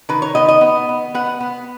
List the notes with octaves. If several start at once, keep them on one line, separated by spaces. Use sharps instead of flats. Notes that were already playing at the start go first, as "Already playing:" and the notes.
D#3 B4
C#5
B3 D#5
D#5
B3
B3
B3 F#5
B3